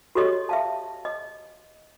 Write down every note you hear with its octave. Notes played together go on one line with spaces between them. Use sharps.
F#4 G4 A4 C#5 D#5
E5 F5 A5
D#5